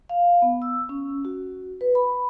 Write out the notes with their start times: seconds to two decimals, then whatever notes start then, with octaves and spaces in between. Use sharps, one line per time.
0.09 F5
0.42 B3
0.62 E6
0.89 C#4
1.25 F#4
1.81 B4
1.95 B5